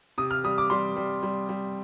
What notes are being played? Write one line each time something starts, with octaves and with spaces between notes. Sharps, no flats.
C3 D#6
F6
G3 D#6
D6
G3 C6
G3
G3
G3